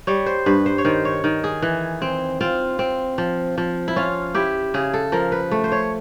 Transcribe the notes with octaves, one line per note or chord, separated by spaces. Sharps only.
G3 C#5
C5
G2 B4
C5
C#5
D#3 C5
C#5
D#3
G#4
E3
C4
C4 F4
C4
F3
F3
E4
C#4 F4
E4 G4
C#3 G#4
A4
F3 A#4
B4
A3
C5
C#5